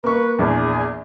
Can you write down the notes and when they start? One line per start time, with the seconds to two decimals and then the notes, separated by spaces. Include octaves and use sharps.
0.04 A#3 B4 C#6
0.39 A#1 E2 G#4